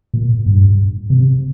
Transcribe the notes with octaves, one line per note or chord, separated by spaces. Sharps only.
A#2
G2
C3